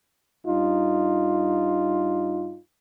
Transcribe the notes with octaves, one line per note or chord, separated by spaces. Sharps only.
G2 D#4 F4